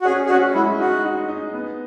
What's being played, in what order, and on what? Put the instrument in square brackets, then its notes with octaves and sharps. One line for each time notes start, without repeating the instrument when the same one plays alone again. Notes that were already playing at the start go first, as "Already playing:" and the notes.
[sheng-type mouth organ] F#4
[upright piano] C#4 [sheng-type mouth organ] G#4
[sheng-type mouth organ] G#4
[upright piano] C#4 [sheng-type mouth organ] F#4
[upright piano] G#3 [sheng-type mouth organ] E4
[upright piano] D#4 [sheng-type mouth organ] F#4
[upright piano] D#4
D#4
B3